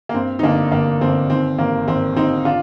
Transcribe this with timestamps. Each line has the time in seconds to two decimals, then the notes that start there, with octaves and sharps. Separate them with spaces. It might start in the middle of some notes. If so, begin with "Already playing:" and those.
0.09 A#3
0.14 G2 C4
0.39 D#4
0.43 G1 A#3 D4
0.72 G1 A#3 D4
1.01 G1 C4
1.30 D#3 C4
1.58 G#1 A#3
1.87 G#1 C4
2.16 G#1 C4 D#4
2.45 D4 F4